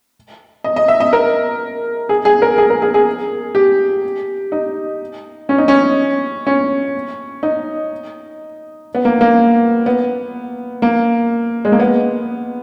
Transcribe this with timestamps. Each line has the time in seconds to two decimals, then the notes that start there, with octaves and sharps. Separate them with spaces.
0.64 D#5
0.76 D#5
0.88 E5
1.00 D#5
1.13 A#4
2.09 G#4
2.25 G#4
2.42 A#4
2.58 G#4
2.70 A#4
2.82 G#4
2.94 G#4
3.55 G4
4.52 D#4
5.49 C#4
5.58 D#4
5.68 C#4
6.47 C#4
7.43 D#4
8.95 B3
9.05 A#3
9.21 A#3
9.86 B3
10.82 A#3
11.65 G#3
11.72 A#3
11.80 B3